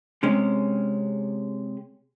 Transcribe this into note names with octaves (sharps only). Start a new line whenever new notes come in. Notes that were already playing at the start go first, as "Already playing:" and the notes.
C3 G#3 C#4